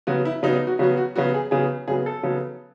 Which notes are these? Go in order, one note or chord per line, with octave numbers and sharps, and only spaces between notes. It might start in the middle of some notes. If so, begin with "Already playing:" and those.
C#3 F#3 B3 F#4
E4
C#3 F#3 B3 D#4
D#4
F#4
C#3 F#3 B3 F#4
F#4
C#3 F#3 B3 F#4
G#4
C#3 F#3 B3 G#4
C#3 F#3 B3 G#4
A4
C#3 F#3 B3